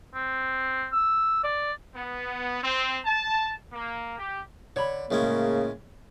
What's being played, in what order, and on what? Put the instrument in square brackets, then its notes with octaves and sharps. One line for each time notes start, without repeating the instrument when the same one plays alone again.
[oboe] C4
E6
D5
[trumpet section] B3
C4
A5
A#3
G4
[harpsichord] D3 [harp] C#5 B5
[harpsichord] A2 G#3 C#4 [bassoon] C#3 [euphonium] A#3